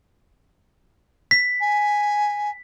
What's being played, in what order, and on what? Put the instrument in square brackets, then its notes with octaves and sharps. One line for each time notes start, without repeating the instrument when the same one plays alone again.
[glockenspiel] B6
[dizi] G#5